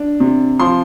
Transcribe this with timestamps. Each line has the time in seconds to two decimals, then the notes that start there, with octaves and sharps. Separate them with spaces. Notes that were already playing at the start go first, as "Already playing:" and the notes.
Already playing: D4
0.20 C3
0.60 F3 C6